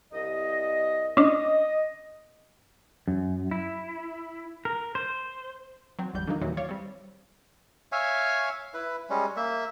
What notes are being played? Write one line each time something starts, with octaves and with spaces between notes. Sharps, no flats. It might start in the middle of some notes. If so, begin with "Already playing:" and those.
C2 D#5
C#4 D4 D#5
F#2
E4
A#4
C5
F#3 C4
G#1 E2 G3 G6
D3 D#3 F#3 A#3 D#4
D#2 A#2 D#3 E3 F#3 G3
C#5 D5 F5
G3 C4
C#5 E5 F5 G#5
E4 B4
G3 G#3 C#4
A#3 E5